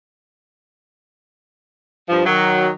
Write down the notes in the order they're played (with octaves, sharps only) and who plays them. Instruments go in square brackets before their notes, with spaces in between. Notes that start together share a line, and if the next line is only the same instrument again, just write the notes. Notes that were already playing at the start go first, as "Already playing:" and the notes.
[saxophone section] G2 F3
D#3 F#3